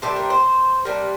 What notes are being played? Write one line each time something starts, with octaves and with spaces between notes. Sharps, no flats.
C3 G3 D4 A4
A#4
C5
C3 G3 D4 A#4